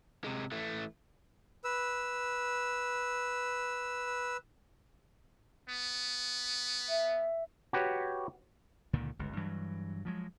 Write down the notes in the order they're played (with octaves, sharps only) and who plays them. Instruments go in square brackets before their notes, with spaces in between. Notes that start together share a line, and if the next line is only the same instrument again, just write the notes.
[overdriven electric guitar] C3 G#3
E3 A3
[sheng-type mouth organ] B4 E6
[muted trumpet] B3
[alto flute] E5
[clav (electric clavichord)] F#4 G4 B4 C#5
[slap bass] C#2 A#2 D3 D#3
G1 C#2
G2 E3 F#3
F3 F#3 G#3